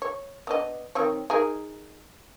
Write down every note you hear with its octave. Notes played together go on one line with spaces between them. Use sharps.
C#5
B3 D4 D#5
D#3 C4 C#5
D#4 G#4 A#4